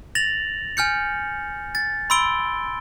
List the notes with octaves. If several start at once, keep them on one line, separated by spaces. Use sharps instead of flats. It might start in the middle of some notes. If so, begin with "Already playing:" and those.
A6 A#6 F7 F#7
G#5 F6 G6 C#7
A6
B5 C6 E6 D7 G7